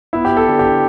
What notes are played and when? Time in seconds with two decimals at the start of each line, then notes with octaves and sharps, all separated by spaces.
0.13 B3 E4
0.25 G4
0.31 B3
0.37 A4
0.48 D3
0.59 G4
0.65 D3